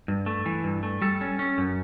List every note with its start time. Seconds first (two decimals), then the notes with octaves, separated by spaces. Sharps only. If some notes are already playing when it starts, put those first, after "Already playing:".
0.08 G2
0.26 A3
0.46 E3
0.64 G2
0.83 A3
1.02 G3 A4
1.21 C#4
1.39 C#4
1.58 F#2